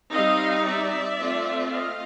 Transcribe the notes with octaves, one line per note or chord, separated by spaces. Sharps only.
G3 C4 D#4 D#5 F5
D5 E5
A3 C4 F4
D#5 F5